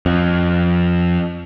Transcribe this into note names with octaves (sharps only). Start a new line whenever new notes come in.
F2